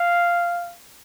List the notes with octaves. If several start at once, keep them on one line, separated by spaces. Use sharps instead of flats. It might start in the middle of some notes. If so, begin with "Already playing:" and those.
Already playing: F5